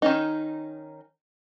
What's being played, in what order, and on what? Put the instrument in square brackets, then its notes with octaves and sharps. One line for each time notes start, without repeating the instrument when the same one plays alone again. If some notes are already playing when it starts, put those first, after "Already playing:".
[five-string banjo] D#3 C#4 D#4